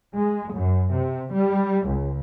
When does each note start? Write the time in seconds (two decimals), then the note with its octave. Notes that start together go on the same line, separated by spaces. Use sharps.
0.13 G#3
0.53 F#2
0.91 C3
1.31 G3
1.87 C#2